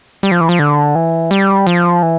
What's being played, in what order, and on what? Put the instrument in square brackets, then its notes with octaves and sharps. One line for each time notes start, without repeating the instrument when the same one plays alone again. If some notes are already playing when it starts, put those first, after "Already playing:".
[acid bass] G3
F3
E3
F3
D3
E3
G3
F3
E3